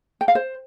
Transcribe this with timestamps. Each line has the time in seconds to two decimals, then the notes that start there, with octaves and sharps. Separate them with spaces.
0.21 G5
0.28 F5
0.35 C5